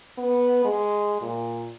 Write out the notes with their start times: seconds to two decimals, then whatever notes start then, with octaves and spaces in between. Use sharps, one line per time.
0.18 B3
0.65 G#3
1.21 A#2